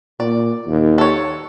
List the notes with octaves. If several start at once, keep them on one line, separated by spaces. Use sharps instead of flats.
A#2 D5
D#2
A4 C#5